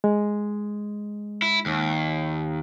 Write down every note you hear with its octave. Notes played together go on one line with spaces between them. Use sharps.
G#3
E4
D#2